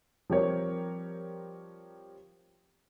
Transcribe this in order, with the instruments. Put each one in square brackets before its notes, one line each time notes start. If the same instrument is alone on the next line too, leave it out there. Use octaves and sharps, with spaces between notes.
[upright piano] F3 G3 C4 G4 A#4 C#5